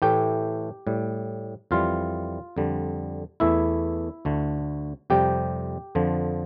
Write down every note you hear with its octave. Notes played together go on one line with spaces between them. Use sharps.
A2 E3 A3 G4 G5
A2 G3
F2 E3 G3 F4 F5
F2 D3 G3
E2 E3 A3 E4 E5
D2 D3 A3
F2 C3 G3 G4 G5
F2 D3 F3